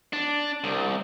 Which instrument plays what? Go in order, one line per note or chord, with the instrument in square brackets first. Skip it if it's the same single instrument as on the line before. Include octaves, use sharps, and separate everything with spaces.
[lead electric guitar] D4
C2